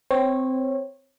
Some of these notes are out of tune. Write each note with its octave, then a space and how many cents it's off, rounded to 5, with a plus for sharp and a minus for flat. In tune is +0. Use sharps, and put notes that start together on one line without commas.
C4 -10 C#5 -20